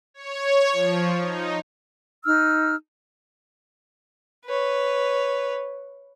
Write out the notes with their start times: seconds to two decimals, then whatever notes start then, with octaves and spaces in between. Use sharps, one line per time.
0.14 C#5
0.72 F3
1.21 D#4
2.24 D#4 E6 F6
4.45 B4 C#5